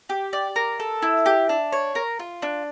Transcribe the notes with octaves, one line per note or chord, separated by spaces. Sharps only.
G4
D5
A#4
A4
E4
G4
D4
C#5
A#4
F4
D4